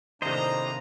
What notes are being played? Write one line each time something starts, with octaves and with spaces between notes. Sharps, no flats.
A2 C3 D#3 A#3 D4 C5 D#5 A#5